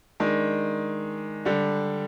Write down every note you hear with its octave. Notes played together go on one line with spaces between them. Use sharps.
D#3 G#3 D4
D3 G3 D4